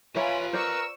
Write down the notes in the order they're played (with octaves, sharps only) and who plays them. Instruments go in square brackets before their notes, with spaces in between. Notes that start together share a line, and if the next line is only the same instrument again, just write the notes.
[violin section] F4 G#5 B5 [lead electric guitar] B4 A#5 [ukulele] C#5 E5
[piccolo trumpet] A#4 [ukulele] C5 D5 [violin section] C#6 E6